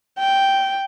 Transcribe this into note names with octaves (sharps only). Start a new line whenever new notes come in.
G5